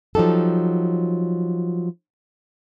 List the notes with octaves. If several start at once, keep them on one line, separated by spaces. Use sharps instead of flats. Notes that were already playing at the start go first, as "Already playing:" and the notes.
F3 F#3 D#4 G4 A4